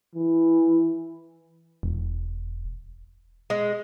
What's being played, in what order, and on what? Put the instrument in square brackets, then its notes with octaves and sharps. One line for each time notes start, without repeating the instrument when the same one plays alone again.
[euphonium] E3
[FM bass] E1
[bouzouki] G#3